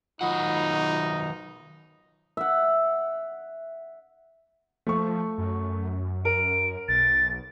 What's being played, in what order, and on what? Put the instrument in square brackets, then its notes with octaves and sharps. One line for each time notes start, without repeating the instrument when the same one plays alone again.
[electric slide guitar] D#3 F#3 F#5 [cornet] D#4 [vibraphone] F4 B5 D#6
[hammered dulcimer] E5 F#5
[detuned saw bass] F3 [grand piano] A3 C#6
[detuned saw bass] F#2
[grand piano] A#4 [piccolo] D7
[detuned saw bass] B1 [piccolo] A6